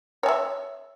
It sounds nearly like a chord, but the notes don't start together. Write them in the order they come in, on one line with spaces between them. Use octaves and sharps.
C#5 G#5 E5